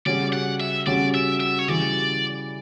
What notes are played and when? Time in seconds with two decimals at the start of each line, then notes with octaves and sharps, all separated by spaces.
0.06 C#3 G3 C#4 F#4 D5
0.33 F#5
0.60 E5
0.86 C#3 G3 C#4 F#4 D5
1.14 E5
1.40 E5
1.59 C#5
1.68 C#3 E3 G3 D5